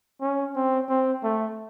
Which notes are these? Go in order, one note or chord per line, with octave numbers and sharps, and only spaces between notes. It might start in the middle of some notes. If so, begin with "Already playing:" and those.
C#4
C4
C4
A3